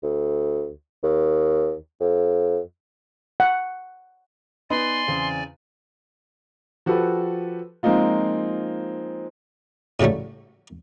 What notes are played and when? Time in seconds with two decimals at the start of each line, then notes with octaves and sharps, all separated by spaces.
0.03 D2
1.04 D#2
2.00 F2
3.40 F#5
4.70 B3 D#4 B4 D5 G#5 C6
5.07 E2 C#3 C4
6.86 F3 F#4 G4 A4 B4
7.83 F3 G#3 A#3 C4 D#4 F4
10.00 A2 C#3 F#3 G3 A3